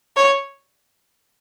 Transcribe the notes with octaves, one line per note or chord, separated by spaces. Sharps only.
C#5